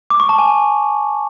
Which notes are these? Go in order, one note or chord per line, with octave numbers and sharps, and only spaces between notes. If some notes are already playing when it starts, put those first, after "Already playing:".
D6
C#6
A5
G#5